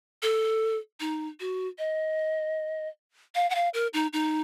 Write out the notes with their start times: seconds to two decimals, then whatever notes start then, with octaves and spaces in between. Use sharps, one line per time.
0.23 A4
1.00 D#4
1.40 F#4
1.78 D#5
3.35 F5
3.50 F#5
3.55 F5
3.74 A#4
3.93 D#4
4.13 D#4